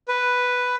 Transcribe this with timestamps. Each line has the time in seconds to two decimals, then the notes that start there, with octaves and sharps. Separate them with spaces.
0.08 B4